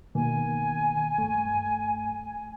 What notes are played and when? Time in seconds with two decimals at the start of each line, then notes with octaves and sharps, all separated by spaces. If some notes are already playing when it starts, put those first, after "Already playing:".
0.15 B2 D#3 A#3 G#5
1.18 G2 A3